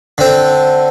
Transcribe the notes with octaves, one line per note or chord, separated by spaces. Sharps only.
D3 C4